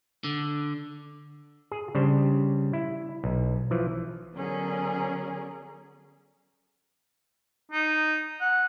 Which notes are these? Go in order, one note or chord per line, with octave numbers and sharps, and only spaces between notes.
D3
G#4
C#3 G3 D4 C5
E4
B1
E3 F3
D3 F#3 B3 C#4 G#4 A#4
D#4
F#5